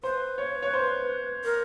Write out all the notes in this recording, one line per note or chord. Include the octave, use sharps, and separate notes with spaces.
B4 C5
C#5
C#5
C5
A#4